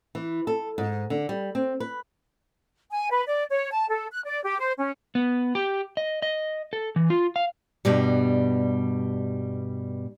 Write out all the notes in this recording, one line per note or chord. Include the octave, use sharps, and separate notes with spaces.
E3
A4
G#2
D3
G3
C4
B4
G#5
B4
D5
C#5
A5
A4
F#6
D5
G4
C5
C#4
B3
G4
D#5
D#5
A4
E3
F4
F5
G2 B2 G3